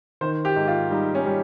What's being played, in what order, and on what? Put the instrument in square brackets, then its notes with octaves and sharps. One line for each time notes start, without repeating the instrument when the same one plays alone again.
[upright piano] D#3 C5
G4
G#2
F4
G3 D#4
C#4
G3